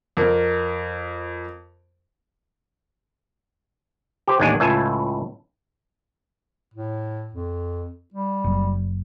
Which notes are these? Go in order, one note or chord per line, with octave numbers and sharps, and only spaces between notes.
F2 A#4
G4 C5
A1 D#2 G#3 D4 G#5
C#2 A2 F4 E5 G#5 A5
A2
F2
G3
F#1